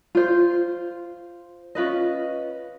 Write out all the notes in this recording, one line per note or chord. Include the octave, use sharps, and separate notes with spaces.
F4 C5
C#4 F4 B4 D#5